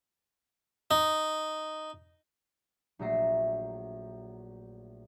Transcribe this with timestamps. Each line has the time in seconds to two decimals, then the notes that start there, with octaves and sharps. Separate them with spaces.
0.91 D#4
2.99 A#1 F#3 A3 E5 A#5 C7